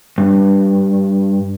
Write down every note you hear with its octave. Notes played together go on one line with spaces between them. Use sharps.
G2